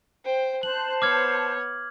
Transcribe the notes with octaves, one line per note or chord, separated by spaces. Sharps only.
C5 G5
C5 A5 F#6 F#7
B3 C#5 D6 F6 G#6